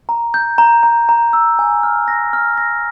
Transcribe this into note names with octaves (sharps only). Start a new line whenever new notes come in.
A#5
G6
A#5
A#5
A#5
E6
G#5
F6
A#6
F6
A#6